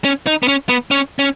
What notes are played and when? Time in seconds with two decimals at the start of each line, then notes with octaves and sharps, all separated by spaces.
0.05 C#4
0.27 D#4
0.43 B3
0.48 C#4
0.69 B3
0.91 C#4
1.19 C#4